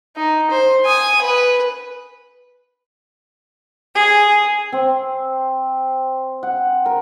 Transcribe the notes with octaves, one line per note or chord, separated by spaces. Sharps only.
D#4
C5
G#5 D#6
B4
G#4
C4
F#5
A#4